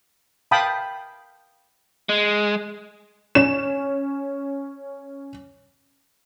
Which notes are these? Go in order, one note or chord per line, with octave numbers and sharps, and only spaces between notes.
F5 G5 A5 B5 D#6
G#3
C#4 E7